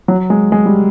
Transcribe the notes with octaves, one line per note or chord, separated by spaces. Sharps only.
F#3
G#3
G#3
G3